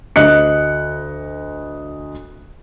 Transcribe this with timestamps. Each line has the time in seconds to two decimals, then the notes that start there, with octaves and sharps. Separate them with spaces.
0.16 D2 D#5 F#6 C#7